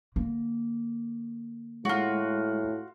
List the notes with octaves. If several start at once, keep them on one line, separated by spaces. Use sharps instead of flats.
D3 A#3
A2 G#3 F4 F#4